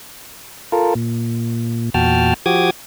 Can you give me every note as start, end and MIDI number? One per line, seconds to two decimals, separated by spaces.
0.72 0.94 65
0.72 0.94 69
0.72 0.94 70
0.95 1.90 46
1.94 2.34 40
1.94 2.34 46
1.94 2.34 66
1.94 2.34 79
1.94 2.34 81
1.94 2.34 89
2.46 2.70 53
2.46 2.70 66
2.46 2.70 67
2.46 2.70 86
2.46 2.70 87
2.46 2.70 92